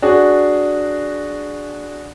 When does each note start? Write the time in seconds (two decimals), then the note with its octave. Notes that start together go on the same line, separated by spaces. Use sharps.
0.02 D4 F#4 G#4